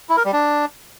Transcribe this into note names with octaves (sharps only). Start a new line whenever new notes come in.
E4
A#4
G3
D4